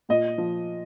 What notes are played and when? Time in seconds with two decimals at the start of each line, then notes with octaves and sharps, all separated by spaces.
0.09 A#2 D#5
0.38 F3